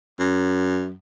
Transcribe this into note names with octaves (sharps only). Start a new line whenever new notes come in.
F#2